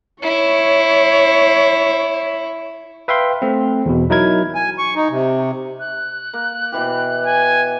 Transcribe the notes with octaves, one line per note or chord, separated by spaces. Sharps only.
E4 C#5
B4 E5 F5 G5 C6
A3 C4
E2 B2
F#3 D#4 E4 A#4 G#6
G#5
C#6
D#4
C3
F#6
A#3
B2 E3 G4
G#5